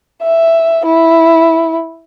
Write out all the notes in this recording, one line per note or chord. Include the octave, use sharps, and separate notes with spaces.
E5
E4